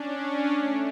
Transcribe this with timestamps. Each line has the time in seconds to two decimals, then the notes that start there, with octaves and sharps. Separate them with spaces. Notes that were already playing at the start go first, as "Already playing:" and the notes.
Already playing: C#4 D4
0.52 A3